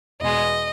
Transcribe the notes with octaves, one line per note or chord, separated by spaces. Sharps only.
E2 B2 G#3 D#5